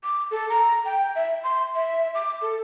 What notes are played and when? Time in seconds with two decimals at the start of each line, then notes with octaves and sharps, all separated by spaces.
0.03 D6
0.31 A4
0.50 A#5
0.85 G5
1.15 E5
1.44 C6
1.75 E5
2.15 D6
2.42 A4